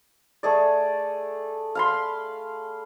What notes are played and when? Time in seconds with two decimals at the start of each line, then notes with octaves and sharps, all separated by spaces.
0.43 A3 G#4 D5
1.75 F5 B5 C6